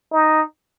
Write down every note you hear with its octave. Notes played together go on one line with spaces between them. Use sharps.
D#4